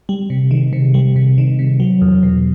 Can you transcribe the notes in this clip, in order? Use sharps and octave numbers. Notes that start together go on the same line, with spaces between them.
G3
C3
D#3
C3
G3
C3
D#3
C3
F#3
E2
B2